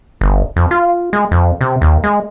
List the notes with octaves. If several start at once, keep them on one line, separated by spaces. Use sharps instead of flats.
G1
F2
F4
G#3
F2
C3
D#2
G#3